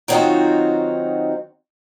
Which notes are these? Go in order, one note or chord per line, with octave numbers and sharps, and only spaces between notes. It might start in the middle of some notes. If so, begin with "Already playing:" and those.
D#3 F#3 C4 D#4 F4 F#4